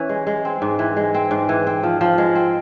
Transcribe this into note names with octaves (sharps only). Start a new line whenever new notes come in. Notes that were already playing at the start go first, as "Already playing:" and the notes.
Already playing: E3 C#4
G#3
G#3
C4
G#2
E3
G#3
C4
G#2
E3
C4
F3
F3
G#3
C4